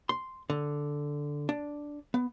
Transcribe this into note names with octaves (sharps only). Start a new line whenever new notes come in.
C6
D3
D4
B3